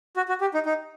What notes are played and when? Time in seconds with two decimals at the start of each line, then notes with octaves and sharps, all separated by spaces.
0.17 F#4
0.29 F#4
0.41 G4
0.54 D#4
0.66 D#4